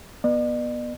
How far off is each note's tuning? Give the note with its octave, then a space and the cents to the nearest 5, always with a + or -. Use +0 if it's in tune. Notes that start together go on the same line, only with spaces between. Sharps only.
B3 -25 D5 +45